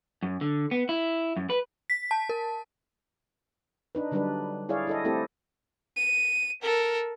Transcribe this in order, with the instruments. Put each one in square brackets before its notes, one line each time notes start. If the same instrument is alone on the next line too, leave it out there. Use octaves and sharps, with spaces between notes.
[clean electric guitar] F#2
D3
B3
E4
F#2
B4
[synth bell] B6
A5
A#4
[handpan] D4 D#4 B4
D3 F#3 G3 D4 D#4 B4
E4 G#4 C#5 D5 F5
E4 A4 D#5
A3 C4 E4 G4 A4
[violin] D#7
A4 A#4